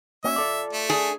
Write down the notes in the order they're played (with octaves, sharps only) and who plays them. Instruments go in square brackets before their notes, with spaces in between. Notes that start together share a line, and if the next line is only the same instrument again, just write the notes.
[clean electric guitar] A#3 C#4 F#4 [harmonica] E5
[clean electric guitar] F4 A4 D5
[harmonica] A3
[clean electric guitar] D4 [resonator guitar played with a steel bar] G#4